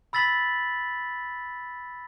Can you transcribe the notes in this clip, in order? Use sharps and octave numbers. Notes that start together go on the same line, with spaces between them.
B5 E6 A6 B6 F#7